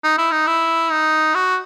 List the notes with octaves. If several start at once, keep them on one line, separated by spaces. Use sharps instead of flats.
D#4
E4
D#4
E4
D#4
F#4